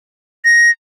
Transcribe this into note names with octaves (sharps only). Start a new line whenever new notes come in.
A#6